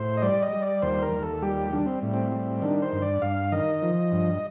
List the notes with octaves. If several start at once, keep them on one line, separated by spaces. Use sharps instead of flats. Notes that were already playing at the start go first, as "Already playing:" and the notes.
Already playing: A2 C5
D#5
G3 D5
D#5
G3
D5
D#2 C5
A#4
D#2
A4
G3 G4
G3 D4
C4
A2
C4
G3
D#3 D4
C5
G2
D5
G2 F5
D#3 D#5
F3
G2